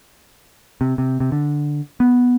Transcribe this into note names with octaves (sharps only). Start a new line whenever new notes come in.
C3
C3
C3
D3
B3